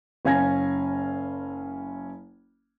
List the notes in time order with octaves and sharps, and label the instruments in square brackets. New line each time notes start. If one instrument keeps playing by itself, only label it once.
[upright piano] F#1 C#4 F5 G#5 G#6 A#6